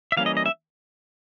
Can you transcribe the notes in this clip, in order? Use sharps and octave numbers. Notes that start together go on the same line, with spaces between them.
E5
E3 G3 A#3 C#4 F5
D#5
D#5
E5